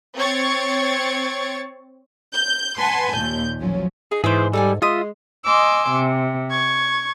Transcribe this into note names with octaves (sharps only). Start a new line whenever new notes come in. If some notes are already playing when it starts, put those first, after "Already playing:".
C4 C#5 C#6 G#6 A6 C#7
G6
B4 F#5 G#5 A5 C6
D#2 A#2 G6
A1 F3 F#3 C#4
D#4 G#4
G#2 E3 G#4 C5 C#5 D6
G3 D#4 A4 D5 G#5
G#3 F4 D#5 E5 C6 D#6
D#5 G#5 C6 D6 E6
C3
C#6 G#6